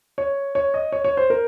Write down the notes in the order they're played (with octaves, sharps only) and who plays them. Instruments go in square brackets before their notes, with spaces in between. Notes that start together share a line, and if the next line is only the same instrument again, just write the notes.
[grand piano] C#5
C#5
D#5
C#5
C#5
C5
A#4